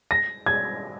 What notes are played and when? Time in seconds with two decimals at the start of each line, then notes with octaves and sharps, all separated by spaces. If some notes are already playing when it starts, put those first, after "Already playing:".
0.11 A#6
0.46 G#6